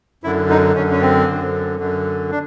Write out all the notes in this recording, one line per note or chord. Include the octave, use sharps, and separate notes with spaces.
F#2 D3 E4
D#4
F#2 D3 C#4
C#4
C4
F#2 D3
F#2 D3
D4